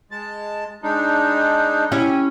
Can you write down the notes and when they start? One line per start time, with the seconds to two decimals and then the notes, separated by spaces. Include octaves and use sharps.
0.11 G#3 A5
0.83 G#3 D4 D#4
1.92 C#4 E4 G4